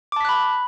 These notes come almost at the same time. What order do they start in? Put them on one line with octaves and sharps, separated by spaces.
D6 A5 B6 F#6 B5